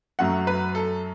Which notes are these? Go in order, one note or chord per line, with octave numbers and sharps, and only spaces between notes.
F#2 F#3 A3 F#5
B4
A4